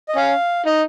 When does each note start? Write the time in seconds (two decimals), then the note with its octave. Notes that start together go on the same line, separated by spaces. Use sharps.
0.09 D#5
0.16 C#4 F5
0.66 D#4 D#5